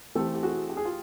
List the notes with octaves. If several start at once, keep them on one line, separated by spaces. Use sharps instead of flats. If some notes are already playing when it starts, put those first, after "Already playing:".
E3 A3 C4 G4 A4
G4
F#4 G#4
G4
G#4
F4 G4